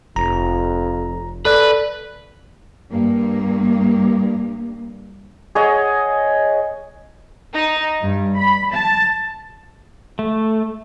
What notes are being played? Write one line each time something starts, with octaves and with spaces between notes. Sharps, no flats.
F1 F2 A#5
A4 B4 D5 F#6
G2 A#3
G#4 C#5 D#5 F#5
D#4
G2
B5
A5
A3